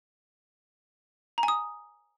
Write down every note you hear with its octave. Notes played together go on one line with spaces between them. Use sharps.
A#5
G#5
D#6